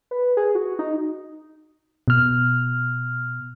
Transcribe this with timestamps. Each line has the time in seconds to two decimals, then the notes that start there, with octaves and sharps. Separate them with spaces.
0.11 B4
0.37 G#4
0.55 F#4
0.79 D#4
2.08 B2 F6